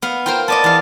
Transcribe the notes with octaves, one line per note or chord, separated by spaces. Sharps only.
B3 F5
F4 A#4 C5 G5
B3 D5 D#5 A5
E2 F5